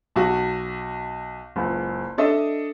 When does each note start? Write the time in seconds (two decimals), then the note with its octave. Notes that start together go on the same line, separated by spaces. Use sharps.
0.16 B1 F#4
1.56 F#1 C#2
2.18 D4 A4 D#5 E5